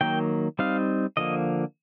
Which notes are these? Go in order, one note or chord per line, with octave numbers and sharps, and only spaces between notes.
D#3 F#3 A#3 G5
G3 C4 D#4 F5
D3 F3 A#3 D#5